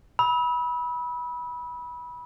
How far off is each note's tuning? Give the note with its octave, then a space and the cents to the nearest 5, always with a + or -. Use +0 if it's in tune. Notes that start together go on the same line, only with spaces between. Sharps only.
B5 -20 E6 -40